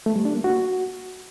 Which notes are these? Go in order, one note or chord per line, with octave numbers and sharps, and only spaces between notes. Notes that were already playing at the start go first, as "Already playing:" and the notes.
A3
G3
D4
A#3
F#4